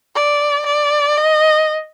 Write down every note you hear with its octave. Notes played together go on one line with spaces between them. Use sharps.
D5
D5
D#5